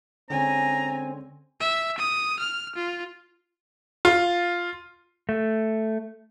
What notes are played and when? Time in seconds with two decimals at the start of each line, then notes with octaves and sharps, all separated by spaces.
0.30 D3 G#3 C4 C#4 G#5 A#5
1.61 E5
1.98 D#6
2.40 F6
2.75 F4
4.05 F4
5.29 A3